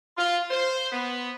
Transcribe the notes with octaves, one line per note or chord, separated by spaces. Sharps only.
F4
C5
B3